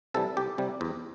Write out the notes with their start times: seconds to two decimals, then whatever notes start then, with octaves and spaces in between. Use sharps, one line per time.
0.14 C3 E3 G3 A4
0.37 C2 G4
0.58 C3 G3
0.81 E2